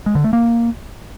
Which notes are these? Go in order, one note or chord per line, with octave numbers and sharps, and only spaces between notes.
G#3
D3
A3
A#3